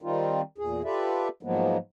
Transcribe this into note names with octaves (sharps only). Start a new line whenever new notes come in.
D#3 G3 C4 D#4 F4
E2 A#2 G#4
F4 G4 A4 B4 D5 E5
G#2 F3 F#3 G#3 A#3 B3